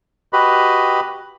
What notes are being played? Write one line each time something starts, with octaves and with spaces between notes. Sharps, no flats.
F#4 G4 B4 D#5 B5